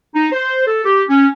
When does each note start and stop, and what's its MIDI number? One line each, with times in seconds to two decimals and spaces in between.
0.15 0.30 63
0.32 0.63 72
0.66 0.80 69
0.84 1.03 67
1.09 1.27 61